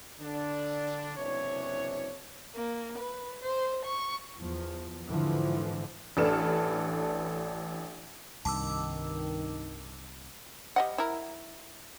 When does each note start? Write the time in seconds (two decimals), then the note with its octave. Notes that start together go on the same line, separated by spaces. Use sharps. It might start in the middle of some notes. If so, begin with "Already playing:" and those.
0.21 D3 D4
1.17 F#1 C3 E3 D4 C#5
2.55 A#3
2.98 B4
3.42 C5
3.85 C#6
4.37 E2 F3
5.08 G#2 D3 E3 F3
6.17 A1 D4 A4 B4 F6 E7
8.45 C2 G2 D#3 A5 D6 E6
10.76 G3 D#5 F#5
10.98 E4 A#4